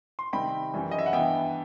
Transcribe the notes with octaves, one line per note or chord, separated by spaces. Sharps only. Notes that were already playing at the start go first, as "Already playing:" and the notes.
C6
C3 D#3 G3 C4 D#4 G5 B5
F#2 E3 G3
D#5
E5
F#5
G2 E3 B3 E5 G5